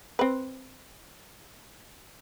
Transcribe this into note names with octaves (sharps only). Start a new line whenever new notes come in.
C4 B4